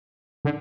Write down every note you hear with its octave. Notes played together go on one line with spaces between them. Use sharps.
D3